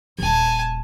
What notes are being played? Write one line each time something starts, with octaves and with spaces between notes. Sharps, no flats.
D#1 G#1 G#5 A5